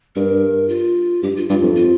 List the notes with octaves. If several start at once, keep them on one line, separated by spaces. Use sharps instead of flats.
G2 A#4
F4
G2 G4
F4
G2 F4
F2
F4